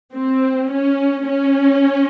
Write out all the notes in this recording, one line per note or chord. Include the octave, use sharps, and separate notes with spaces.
C4
C#4
C#4